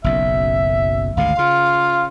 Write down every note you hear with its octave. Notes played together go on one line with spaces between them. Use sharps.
F#1 B1 F#2 E5
G#1 D2 D3 F5
C#3 F4